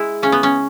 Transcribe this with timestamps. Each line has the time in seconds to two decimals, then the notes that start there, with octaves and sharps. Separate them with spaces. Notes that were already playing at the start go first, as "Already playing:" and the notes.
Already playing: G#3 E4
0.22 C#3 C#4
0.32 B3
0.43 C#4